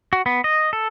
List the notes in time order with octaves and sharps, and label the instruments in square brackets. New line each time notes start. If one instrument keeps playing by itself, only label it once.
[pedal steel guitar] F#4
B3
D#5
A4